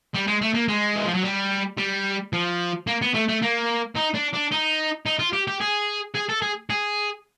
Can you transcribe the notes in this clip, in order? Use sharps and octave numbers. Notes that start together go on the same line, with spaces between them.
G3
G#3
A3
A#3
G#3
E3
F3
F#3
G3
G3
F3
A#3
B3
A3
A3
A#3
D#4
D4
D4
D#4
D#4
F4
G4
G4
G#4
G#4
A4
G#4
G#4